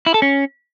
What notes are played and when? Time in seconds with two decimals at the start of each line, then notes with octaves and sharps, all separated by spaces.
0.06 E4
0.14 A4
0.22 C#4